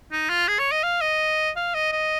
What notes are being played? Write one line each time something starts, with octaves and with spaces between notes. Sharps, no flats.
D#4
F4
G#4
C#5
D#5
F5
D#5
F5
D#5
D#5